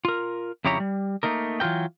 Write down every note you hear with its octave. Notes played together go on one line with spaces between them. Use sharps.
F4 A#4
F2 C#3 E4 G4 C#5 A#5
G3
A3 A#3 D#4 A#4
E3 F#3 F4 A#4 G5